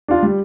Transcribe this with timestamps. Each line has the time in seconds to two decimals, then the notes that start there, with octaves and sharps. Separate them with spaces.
0.08 D4 F4
0.23 G3